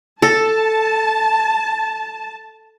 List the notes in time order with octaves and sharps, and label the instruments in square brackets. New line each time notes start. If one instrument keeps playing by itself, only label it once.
[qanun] A4 [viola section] A5